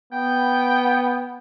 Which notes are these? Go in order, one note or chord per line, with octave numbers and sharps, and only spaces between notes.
B3 G5